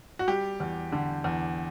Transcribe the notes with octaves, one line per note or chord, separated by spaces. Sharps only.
F#4
G3 G4
E2
D3
E2